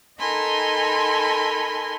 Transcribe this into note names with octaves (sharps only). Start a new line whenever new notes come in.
D#4 A4 A#4 G#5 B5 C6